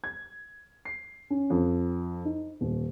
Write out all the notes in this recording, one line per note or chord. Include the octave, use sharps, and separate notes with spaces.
G#6
C7
C#4
F2
D#4
D#1